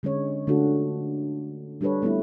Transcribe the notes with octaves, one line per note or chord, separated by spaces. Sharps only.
D3 G#3 C#4 C#5
D3 A3 D4 F4 F#4 A4
G3 D4 G4 A4 B4 C#5
G3 A3 B3 C4 E4 F4